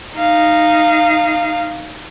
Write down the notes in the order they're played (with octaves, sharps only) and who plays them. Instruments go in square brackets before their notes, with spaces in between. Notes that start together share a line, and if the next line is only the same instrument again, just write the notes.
[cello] D#4 F5